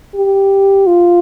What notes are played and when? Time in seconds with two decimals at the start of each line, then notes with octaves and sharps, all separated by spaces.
0.15 G4
0.87 F4